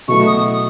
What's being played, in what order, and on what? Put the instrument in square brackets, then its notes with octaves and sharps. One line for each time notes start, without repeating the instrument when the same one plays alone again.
[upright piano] B2 F#3 A3 E4 [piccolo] C#6
[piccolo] D#6